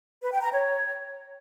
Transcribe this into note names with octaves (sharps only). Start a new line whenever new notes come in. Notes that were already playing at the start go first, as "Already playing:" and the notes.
B4
G5
A#5
C#5